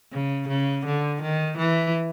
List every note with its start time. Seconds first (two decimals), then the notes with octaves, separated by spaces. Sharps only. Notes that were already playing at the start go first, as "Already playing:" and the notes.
0.12 C#3
0.48 C#3
0.85 D3
1.21 D#3
1.58 E3